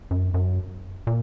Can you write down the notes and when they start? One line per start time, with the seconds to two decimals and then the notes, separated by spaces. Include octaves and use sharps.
0.11 F#2
0.34 F#2
1.07 A#2